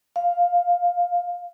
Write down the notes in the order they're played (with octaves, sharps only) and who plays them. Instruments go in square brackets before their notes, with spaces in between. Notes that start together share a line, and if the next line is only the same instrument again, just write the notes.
[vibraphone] F5